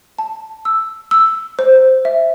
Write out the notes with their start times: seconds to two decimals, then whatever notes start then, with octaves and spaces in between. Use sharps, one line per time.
0.19 A5
0.65 E6
1.11 E6
1.59 C5
2.05 E5